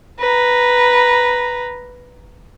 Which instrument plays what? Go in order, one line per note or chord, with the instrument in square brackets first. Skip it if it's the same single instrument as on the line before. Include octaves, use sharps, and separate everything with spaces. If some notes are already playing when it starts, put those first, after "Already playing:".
[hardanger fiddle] B4 A#5